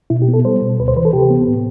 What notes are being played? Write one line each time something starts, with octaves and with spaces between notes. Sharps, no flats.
B2 E4
G4
B3
A4
G3 C5
B2
D2 B4
C5
E3 B4
A4
C3 G4
B3
A2